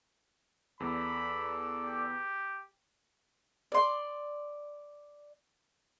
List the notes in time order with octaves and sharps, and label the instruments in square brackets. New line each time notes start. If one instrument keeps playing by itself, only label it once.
[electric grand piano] E2 [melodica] A4 D5 [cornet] B5
[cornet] G4
[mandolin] D5 C6